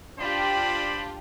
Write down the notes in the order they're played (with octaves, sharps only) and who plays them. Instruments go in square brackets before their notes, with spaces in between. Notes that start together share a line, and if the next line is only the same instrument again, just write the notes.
[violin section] D4 F4 G4 [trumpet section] C5 D5 B5